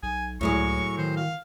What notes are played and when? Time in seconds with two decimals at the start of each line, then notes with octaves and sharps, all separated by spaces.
0.03 B1 G#5
0.41 C#2 A2 F#3 G#4 C#6
0.98 D#3 C5
1.17 F5